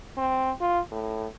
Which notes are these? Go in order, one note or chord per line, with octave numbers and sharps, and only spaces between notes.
C4
F4
A2